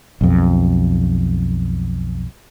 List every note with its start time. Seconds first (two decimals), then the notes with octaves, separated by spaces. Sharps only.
0.21 B1 F2